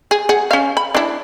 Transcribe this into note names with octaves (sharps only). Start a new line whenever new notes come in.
G#4
G#4 F#5
C#4 F5
B5
D4 E4